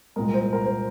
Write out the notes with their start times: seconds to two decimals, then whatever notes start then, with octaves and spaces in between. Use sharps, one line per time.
0.16 C2 A#2 G#3 A#4
0.34 C5
0.53 A#4
0.65 C5